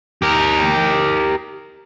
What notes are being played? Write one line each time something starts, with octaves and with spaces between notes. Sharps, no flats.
G4 A#4